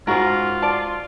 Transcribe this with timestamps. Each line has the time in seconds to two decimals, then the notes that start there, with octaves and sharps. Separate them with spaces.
0.07 G#2 C#3 F4 F#4 A#4
0.62 D5 A5